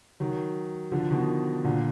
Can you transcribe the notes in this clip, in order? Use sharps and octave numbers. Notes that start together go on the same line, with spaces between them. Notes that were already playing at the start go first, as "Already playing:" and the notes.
D#3 F#3
D3 F3
B2 D#3
A#2 D3